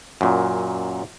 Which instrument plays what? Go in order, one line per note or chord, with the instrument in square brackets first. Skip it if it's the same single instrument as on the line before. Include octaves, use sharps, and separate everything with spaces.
[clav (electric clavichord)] F#2 A#2